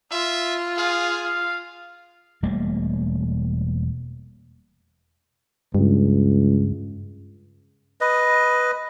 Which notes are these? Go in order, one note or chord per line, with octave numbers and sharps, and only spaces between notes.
F4 E5
G#4 F5
F5
E1 G3 A3 A#3
C#2 G2
B4 D#5